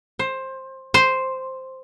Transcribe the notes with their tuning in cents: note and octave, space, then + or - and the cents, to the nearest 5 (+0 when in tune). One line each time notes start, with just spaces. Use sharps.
C5 +15
C5 +0